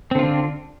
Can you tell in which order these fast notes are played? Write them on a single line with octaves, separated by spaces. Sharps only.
C4 D3 F4 D4